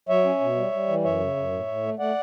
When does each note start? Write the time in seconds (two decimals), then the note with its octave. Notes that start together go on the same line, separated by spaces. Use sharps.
0.09 F#3 C#5 E5
0.24 C#4
0.40 B2
0.56 G3
0.72 G3
0.88 E3
1.04 F#2 C#5 E5
1.20 C#3
1.36 F#2
1.52 A2
1.67 A2
1.83 A3
1.99 A3 D5 F#5